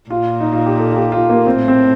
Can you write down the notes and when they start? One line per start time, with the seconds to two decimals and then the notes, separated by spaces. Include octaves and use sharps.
0.10 A#2 F4
0.40 D#4
0.53 F4
0.66 G4
0.78 A4
0.91 F4
0.96 G4
1.12 F4
1.30 A#3
1.47 A2 C4
1.68 C4